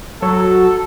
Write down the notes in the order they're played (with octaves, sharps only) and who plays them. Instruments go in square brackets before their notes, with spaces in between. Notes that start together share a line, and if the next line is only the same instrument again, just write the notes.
[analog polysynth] F#3 [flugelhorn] A4